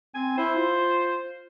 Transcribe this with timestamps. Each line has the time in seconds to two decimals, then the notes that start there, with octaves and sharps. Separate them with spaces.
0.15 C4 G#5
0.37 E4 C5
0.56 F4